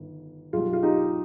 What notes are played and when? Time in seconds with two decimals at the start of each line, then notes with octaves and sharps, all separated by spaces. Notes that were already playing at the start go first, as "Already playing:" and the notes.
Already playing: G1 D#3
0.53 B1 B2 G3 F4 G#4
0.73 F4
0.83 D#4 G4